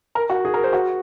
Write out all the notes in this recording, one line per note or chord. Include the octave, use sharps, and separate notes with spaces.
A#4
F#4
G#4
A#4
C5
F#4